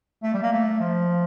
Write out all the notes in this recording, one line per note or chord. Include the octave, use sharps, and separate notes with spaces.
A3
G3
A#3
A3
F3